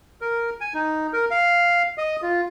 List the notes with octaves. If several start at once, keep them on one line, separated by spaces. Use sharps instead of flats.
A#4
G#5
D#4
A#4
F5
D#5
F4